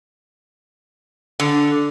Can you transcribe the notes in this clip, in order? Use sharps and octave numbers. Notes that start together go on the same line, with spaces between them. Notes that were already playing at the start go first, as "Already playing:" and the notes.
D3